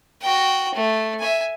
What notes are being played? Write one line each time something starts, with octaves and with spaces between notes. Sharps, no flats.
F#4 G5
A3
E5 G#5